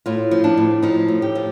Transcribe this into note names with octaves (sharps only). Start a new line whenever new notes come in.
A2 F4
F3
D4
A2
F3 D#4
A2
G4
F3